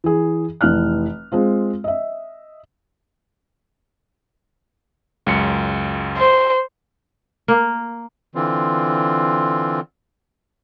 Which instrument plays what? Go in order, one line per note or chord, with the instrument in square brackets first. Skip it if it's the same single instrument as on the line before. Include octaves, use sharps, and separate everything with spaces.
[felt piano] E3 G#4
F1 E3 F6 F#6
G#3 C4 F4
D#5 E5
[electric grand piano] C#2 F#2 C#7
[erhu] C5
[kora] A#3
[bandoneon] D3 E3 C4 F4